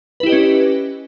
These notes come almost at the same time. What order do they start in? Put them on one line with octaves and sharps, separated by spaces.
B4 E4 G4 D#5 C#4